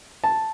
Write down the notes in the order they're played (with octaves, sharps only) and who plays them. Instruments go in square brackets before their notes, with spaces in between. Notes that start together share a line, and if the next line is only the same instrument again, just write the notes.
[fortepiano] A5